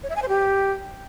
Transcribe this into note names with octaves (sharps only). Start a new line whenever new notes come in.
C#5
E5
G#5
C5
G4